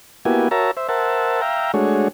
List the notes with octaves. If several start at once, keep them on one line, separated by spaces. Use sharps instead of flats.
A#3 B3 E4 F#4 G4 G#5
F#4 A#4 C#5 E5 A5 A#5
C5 E5
A#4 C5 E5 F#5 A5
E5 F5 G5 A#5
G#3 A3 D4 F#4 G#4 C#5